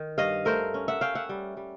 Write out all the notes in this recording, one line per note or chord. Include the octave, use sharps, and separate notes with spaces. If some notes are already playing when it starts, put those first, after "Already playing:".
Already playing: D#3
G2 D#5 F5
A3 A#4 C5
C#4
E5 F#5
C#4 F5 G5
E5 F#5
G3
G3